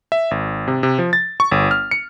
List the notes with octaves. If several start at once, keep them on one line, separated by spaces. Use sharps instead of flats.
E5
G#1
C3
C3
F3
A6
C#6
G1
F6
C#7